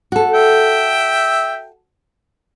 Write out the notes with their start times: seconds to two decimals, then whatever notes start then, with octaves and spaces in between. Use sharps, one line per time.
0.12 F#4 A4
0.33 E5 G5